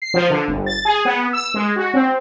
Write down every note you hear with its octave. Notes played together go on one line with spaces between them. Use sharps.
C7
F3
D3
G1
A6
G#4
B3
E6
G#3
F#4
C4